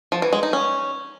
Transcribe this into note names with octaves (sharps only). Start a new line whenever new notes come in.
F3
E3
G#3
D#4
C#4